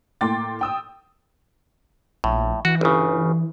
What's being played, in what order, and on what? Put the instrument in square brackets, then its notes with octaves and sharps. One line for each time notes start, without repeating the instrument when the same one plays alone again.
[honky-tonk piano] A2 A#3 G5 C6 D6 A6
G5 D#6 E6
[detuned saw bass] A#1 [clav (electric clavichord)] A2
[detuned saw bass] E3 [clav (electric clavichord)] F#4
[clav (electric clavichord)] G1 C#3